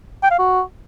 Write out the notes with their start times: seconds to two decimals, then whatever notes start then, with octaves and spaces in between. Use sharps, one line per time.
0.23 G5
0.31 F5
0.39 F#4